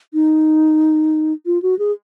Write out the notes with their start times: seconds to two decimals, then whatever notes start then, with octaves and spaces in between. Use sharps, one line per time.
0.14 D#4
1.46 F4
1.62 F#4
1.79 G#4